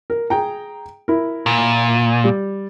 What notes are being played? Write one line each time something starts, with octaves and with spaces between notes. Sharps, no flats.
A#4
G#4 G5 A#5
E4 A#4
A#2
G3